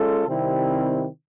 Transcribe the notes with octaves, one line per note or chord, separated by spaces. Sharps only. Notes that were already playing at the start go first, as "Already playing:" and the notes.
Already playing: G#3 C#4 F4 A4
C3 D#3 G3 C4 E4